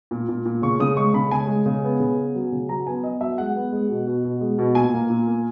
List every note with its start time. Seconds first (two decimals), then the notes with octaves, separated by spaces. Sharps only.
0.11 A#2
0.28 A#2
0.45 A#2
0.62 C#3 C#6
0.80 C#3 D#6
0.97 G#3 C#6
1.14 C#3 B5
1.31 C#3 G#5
1.48 G#3
1.66 C#3
1.84 B3
2.00 C#3
2.17 B3
2.35 F#3
2.52 C#3
2.69 F#3 A#5
2.87 B3 G#5
3.03 B3 D#5
3.21 F#3 E5
3.38 G#3 F#5
3.56 B3
3.72 G#3
3.89 B2
4.07 B2
4.24 B2
4.41 G#3
4.59 B2
4.75 A#2 G#5
4.93 A#3
5.10 A#2
5.27 A#3